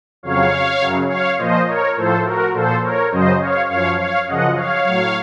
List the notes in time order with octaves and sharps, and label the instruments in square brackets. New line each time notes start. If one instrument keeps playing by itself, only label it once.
[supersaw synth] F2 C#3 F#3 C#5 F5
F#2 C#3 F#3
C#5 F5
A#2 F3 C5 D#5
A#4 C#5
A2 F3 A4 C5
F#4 A#4
A#2 F3 A4 C5
A#4 C#5
F#2 C#3 F#3 C5 D#5
C#5 F5
F#2 F3 C#5 F5
C#5 F5
F#2 C#3 F3 D#5 F#5
C#5 F5
A2 F#3